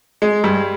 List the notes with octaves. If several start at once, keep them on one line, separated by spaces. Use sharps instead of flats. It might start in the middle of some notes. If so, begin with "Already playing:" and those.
G#3
G2